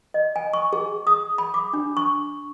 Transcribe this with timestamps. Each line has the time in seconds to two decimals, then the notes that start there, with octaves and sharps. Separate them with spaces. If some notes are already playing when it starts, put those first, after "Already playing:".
0.14 D#5
0.36 G#5
0.53 C#6
0.73 G#4
1.07 D#6
1.38 B5
1.54 D6
1.73 D4
1.97 C#6